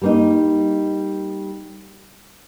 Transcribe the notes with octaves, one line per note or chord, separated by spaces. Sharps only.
G3 A#3 D#4